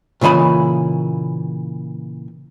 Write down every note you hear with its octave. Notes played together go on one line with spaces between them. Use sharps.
A#2 C#3 E3 D#5 B5